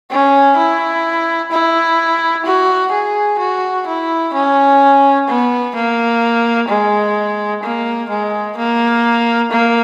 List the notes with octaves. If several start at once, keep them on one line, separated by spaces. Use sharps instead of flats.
C#4
E4
E4
F#4
G#4
F#4
E4
C#4
B3
A#3
G#3
A#3
G#3
A#3
A#3